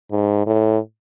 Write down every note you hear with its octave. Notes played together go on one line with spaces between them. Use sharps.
G#2
A2